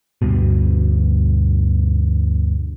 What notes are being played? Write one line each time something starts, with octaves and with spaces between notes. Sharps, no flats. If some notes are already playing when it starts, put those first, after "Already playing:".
D2 G2 B2